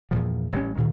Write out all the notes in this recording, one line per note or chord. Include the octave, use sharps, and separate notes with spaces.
E2 G2 A#2 F3
A1 G3 C#4
D2 A#2 D#3